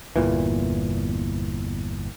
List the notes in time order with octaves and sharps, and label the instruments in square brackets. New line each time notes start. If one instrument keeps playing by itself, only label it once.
[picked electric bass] G1 E2 A#2 E3